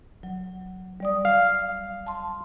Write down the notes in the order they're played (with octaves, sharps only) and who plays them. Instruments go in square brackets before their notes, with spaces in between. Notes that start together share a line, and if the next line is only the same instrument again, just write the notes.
[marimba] F#3
G3 D5 D#6
[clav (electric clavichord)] F5
[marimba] A5 C6